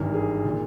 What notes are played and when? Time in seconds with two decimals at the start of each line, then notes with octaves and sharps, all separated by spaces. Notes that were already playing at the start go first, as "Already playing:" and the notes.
Already playing: G#1 G2 E3 A#4
0.14 G#4
0.45 A#2